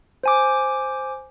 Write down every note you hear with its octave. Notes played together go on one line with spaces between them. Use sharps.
C5 G#5 D6